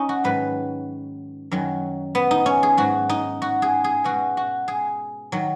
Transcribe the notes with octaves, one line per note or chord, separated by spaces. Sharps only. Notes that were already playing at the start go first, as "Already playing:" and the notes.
Already playing: C#4 D#4
F#4
G#2 D#3 F#3 B4
F#2 D#3 F#3
B3
D#4
C#4
G#4
G#2 F#3 F#4
D#4
F#4
G#4
G#4
B2 G#3 F#4
F#4
G#4
D#3 F#3